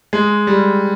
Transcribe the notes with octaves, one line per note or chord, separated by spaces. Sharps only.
G#3
G3